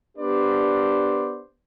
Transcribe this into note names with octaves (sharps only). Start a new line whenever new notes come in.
B3 D4 G4 B4 C5 D5